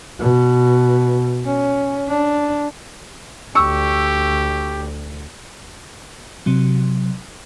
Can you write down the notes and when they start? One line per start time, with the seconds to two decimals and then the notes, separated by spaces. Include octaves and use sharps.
0.20 B2
1.45 C#4
2.08 D4
3.55 D2 G4 C#6 E6
6.46 C3 F#3